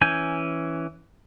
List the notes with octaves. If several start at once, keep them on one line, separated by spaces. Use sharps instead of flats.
E3 C#4 G#5 G6